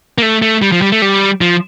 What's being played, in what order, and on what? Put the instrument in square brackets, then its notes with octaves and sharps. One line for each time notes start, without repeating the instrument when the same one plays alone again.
[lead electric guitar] A#3
A3
A3
G3
F3
G3
A3
G3
F3